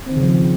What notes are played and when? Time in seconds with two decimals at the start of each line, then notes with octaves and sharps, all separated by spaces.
0.06 C4
0.12 D#3
0.17 C#3
0.22 F3